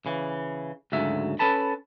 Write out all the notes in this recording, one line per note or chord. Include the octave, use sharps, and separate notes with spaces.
C#3 E3
D2 G#2 C#3 F#3 E5
C#4 A4 B4 A5 B5